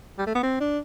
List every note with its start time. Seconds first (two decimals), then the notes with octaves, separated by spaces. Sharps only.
0.18 G3
0.27 A3
0.35 B3
0.43 C4
0.60 D4